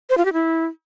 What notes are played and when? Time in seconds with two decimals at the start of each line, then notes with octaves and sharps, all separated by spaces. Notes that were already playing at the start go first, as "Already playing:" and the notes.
0.10 C5
0.17 F4
0.25 G4
0.33 E4